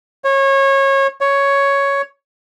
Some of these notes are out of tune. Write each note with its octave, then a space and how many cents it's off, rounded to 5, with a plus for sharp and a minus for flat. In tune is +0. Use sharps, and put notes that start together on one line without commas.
C#5 -25
C#5 +5